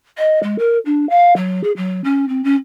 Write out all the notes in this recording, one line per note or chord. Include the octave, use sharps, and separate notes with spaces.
D#5
G#3
A#4
D4
F5
F#3
G#4
F#3
C#4
C4
C#4